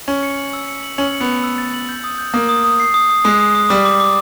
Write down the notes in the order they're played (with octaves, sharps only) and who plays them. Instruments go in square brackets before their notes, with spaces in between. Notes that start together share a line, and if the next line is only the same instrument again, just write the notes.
[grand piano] C#4 [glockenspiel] F#7
[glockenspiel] C#7
F#7
E6
C#7
F#7
[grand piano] C#4 [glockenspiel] F#7
[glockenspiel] C#7
[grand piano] B3
[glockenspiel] F#7
E6
A6
F#7
G6
D#6
G6
[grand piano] A#3 [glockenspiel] D#6
[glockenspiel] D#6
D#6
C7
D#6
D#6
[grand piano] G#3 [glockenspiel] D#6
[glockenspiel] D#6
D#6
[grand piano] G3 [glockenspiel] D6
[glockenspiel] D6
D6